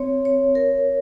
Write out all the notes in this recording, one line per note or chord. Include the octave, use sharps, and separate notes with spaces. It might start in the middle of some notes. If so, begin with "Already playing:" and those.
Already playing: C4 C#5
C#5
A#4